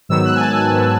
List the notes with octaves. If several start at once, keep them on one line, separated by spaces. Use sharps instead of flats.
G#2 D#3 F#3 B3 E6
F#6
G#5
A5
G#5
G#2 D#3 F#3 B3